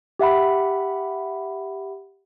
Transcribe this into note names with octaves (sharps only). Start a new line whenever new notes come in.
G4 E5 F#5 B5